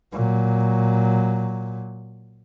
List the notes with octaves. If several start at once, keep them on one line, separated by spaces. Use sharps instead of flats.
A#2 F#3